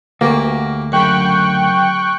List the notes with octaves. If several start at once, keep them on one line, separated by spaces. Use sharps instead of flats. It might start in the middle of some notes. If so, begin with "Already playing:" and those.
D2 A#3 F#4 G4 A#4
F#2 C#3 G5 B5 C#6 F#6